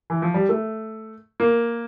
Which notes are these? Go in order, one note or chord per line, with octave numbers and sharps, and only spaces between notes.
E3
F3
G3
A3
A#3